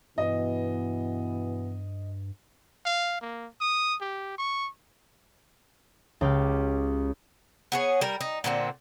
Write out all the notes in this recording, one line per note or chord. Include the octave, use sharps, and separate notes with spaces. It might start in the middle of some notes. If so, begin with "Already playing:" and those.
G2 B2 E3 B3 D#5
F5
A#3
D#6
G4
C#6
C#2 G4 F6
B3 G#4 C#5
G3 A#4
D#4
A#2 D3 B3 C4